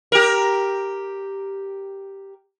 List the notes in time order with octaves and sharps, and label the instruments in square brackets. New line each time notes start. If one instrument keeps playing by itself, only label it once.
[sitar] G4 A#4